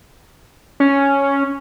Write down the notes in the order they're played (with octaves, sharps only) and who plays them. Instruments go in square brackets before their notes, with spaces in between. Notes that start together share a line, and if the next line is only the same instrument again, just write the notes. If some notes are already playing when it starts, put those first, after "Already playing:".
[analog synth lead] C#4